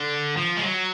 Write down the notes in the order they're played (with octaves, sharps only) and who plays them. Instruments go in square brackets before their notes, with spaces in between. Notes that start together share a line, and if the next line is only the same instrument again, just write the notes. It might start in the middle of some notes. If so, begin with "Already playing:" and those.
Already playing: [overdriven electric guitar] D3
F3
G#3
F#3